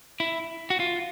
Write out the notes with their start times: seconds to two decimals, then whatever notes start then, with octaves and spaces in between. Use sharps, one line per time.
0.20 E4
0.70 F#4
0.80 F4